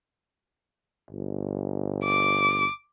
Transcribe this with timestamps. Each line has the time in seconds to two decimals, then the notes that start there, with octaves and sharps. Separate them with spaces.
1.10 G1
2.04 D6